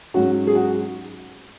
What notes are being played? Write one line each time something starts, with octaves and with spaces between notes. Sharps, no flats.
G#2 F#3 C#4 F#4
G#4
F#4